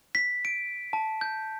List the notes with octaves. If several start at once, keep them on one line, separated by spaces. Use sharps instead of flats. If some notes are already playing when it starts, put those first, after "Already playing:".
B6
D7
A5
G6